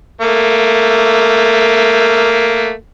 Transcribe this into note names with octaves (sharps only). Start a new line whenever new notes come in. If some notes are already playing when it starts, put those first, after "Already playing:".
A3 A#3